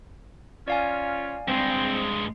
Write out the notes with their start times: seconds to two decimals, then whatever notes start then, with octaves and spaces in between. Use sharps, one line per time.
0.68 C#4 F4 D5 F5 G#5
1.48 G2 G#3 C4